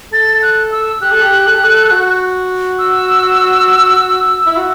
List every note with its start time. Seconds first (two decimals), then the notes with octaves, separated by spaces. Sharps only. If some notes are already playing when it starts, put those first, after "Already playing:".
0.12 A4 A6
0.42 F#6
0.72 E6
1.01 G4 F#6
1.12 A4
1.22 G4
1.47 A4
1.55 G4
1.64 A4
1.91 F#4
2.79 E6
4.47 E4
4.57 F#4